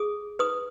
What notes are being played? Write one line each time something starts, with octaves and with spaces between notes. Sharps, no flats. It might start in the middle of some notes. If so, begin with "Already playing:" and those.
Already playing: G#4 D#6
B4 D#6